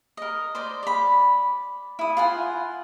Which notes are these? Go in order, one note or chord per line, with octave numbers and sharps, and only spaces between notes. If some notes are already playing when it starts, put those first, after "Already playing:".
A#4 D#5
C5 D5 D#5
D5 B5
E4 D#6
F4 F#5 G#5